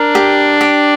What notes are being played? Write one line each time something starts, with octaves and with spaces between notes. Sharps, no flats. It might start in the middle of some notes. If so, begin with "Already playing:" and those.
Already playing: D4 A#4
G4
G4